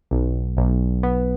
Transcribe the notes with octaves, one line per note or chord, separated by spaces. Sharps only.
B1
B1
B3